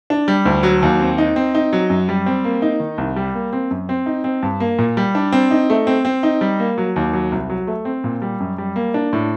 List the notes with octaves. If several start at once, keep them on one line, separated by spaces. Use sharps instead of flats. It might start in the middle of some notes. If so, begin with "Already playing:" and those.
D4
G3
D2
F#3
D#2
C4
D#4
C4
D#4
F#3
F#2
G3
C4
A#3
D#4
D#3
C2
G3
A#3
C4
F#2
C4
D#4
C4
G2
A#3
A#2
G3
D4
C4
D#4
A3
C4
C4
D#4
G3
A#3
F#3
D#2
F#3
C2
F#3
A3
C4
A#2
G3
F#2
G3
A#3
D4
A2